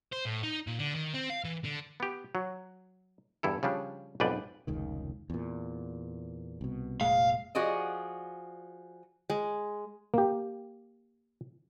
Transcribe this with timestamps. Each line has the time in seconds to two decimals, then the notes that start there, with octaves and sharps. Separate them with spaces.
0.12 C5
0.25 A2
0.43 D#4
0.67 A#2
0.79 D3
0.95 D#3
1.14 C4
1.30 F5
1.44 E3
1.64 D3
2.00 B3 G4
2.35 F#3
3.43 E2 G2 E4 A4
3.63 C#3 F3 G3 D4
4.20 B1 F2 G#2 B4 D5 G5
4.67 F1 C#2 D#3
5.30 E2 A#2
6.61 C2 B2
7.01 F1 A#2 G#3 F5
7.55 F3 F#4 G#4 D5 D#5
9.30 G#3
10.14 A#3 G4